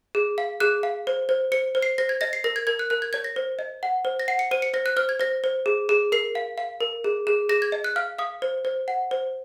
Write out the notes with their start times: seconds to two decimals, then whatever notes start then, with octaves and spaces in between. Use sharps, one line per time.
0.15 G#4
0.38 F5
0.60 G#4 F#6
0.83 F5
1.07 C5
1.29 C5
1.52 C5 C#7
1.75 C5
1.82 C7
1.98 C5 A#6
2.09 G#6
2.21 D#5 A#6
2.33 C7
2.44 A#4 A#6
2.56 G#6
2.67 A#4 G#6
2.79 F#6
2.90 A#4 F#6
3.02 G#6
3.13 C#5 G#6
3.24 A#6
3.36 C5
3.59 D#5
3.83 F#5
4.05 C5
4.20 A#6
4.28 F#5 C7
4.39 C#7
4.51 C5 D#7
4.62 C#7
4.74 C5 A#6
4.86 F#6
4.96 C5 F6
5.09 G#6
5.19 C5 A#6
5.44 C5
5.66 G#4
5.89 G#4
6.12 A#4 C7
6.35 F5
6.58 F5
6.81 A#4
7.04 G#4
7.27 G#4
7.49 G#4 A#6
7.62 G#6
7.72 D#5
7.84 F#6
7.96 F5 F6
8.19 F5 D#6
8.42 C5
8.65 C5
8.88 F#5
9.11 C5